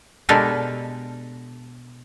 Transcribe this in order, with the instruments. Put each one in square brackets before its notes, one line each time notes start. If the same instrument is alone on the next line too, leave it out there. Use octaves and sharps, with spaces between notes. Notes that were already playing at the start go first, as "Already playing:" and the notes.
[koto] B2 G#3 D4 G4 A4 A#4